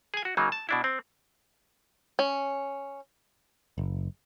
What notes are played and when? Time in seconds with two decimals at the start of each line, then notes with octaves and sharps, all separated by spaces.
0.14 G#4 G#5
0.25 F#4
0.37 C#3 F#3 A#3 D#4
0.52 A5
0.69 B2 D4 E4
0.84 C4
2.19 C#4
3.78 F#1